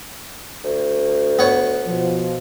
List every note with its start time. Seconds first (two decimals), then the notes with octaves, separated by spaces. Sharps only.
0.64 D2
1.39 B3 C#5
1.87 B2 F3